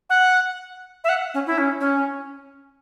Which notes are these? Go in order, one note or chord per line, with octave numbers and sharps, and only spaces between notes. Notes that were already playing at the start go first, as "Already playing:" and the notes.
F#5
E5
F#5
C#4
E4
C#4
C#4